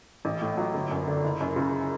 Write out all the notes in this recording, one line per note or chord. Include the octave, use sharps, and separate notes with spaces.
A1
A2
F#3
G1
F#2
D3
F#1
F#2
C#3